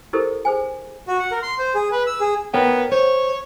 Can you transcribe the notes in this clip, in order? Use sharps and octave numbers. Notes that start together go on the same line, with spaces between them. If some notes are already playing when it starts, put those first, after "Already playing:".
E4 G4 A4 A#4 C5
G#4 C5 G#5
F#4
F#5
A#4
C6
C5
G#4
B4
E6
G#4
B3 A#4 C#5 G5
C5 C#5